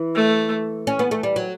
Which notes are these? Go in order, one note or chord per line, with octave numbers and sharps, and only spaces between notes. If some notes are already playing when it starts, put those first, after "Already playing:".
Already playing: E3
A3
C#4
B3
A3
G3
F#3